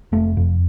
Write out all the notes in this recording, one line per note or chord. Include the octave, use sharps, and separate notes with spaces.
F1 A3
F2